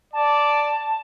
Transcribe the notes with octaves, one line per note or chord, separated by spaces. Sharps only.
D5 A5